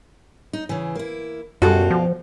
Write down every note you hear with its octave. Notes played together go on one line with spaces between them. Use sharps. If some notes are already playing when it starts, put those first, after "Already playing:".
D#4
C#3 E3
A#3 E4
F#2 B2 G3 F4 F#4 A4
F3